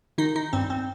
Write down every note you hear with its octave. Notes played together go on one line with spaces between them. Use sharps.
D#3 D#4
D#4
G2 C4
C4